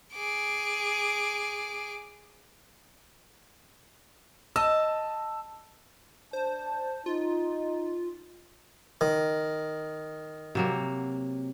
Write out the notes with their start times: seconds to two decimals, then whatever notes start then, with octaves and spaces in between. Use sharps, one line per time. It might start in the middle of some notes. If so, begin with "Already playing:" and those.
0.13 G#4 D6
4.56 D#5 A5 E6
6.33 D4 C5 A5
7.06 D#4 F4
9.01 D#3
10.55 C3 F#3 A#3